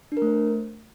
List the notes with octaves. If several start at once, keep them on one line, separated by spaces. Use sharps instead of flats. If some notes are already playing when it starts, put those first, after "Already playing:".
D4
A#4
A3
C5